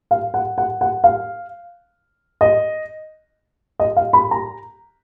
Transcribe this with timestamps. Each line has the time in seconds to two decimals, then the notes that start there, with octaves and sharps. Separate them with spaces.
0.11 F5
0.34 F#5
0.58 F#5
0.81 F#5
1.04 F5
2.41 D#5
3.80 D#5
3.96 F5
4.13 B5
4.31 A#5